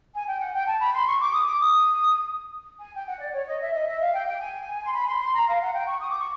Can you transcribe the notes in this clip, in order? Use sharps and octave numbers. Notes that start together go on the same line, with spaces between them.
G#5
G5
F#5
G5
A5
B5
C6
C#6
D6
D#6
D6
D#6
G#5
G5
F#5
D5
C#5
D#5
E5
D#5
E5
F5
G5
G5
G#5
C6
B5
C6
C6
A#5
F5
F#5
G5
C#6
D#6
D6
C#6